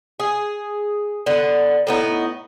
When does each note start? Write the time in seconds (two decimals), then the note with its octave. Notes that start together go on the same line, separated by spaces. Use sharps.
0.20 G#4
1.26 D3 B3
1.87 A2 B3 D#4